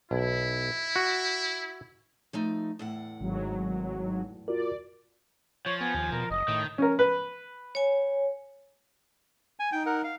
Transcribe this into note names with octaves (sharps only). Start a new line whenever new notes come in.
B1 E4
F#4
F3 A3 D#4
E2 A2 F#5
G#1 G#2 F#3
F4 F#4 A#4 D5
F3 C#5
B3 G#5
D#2
B2 A#4
F#1 D#5
A2 D#3
C#4 A#4
B4
C#5 G#5
G#5
D#4 G5
A#4 F#5
F5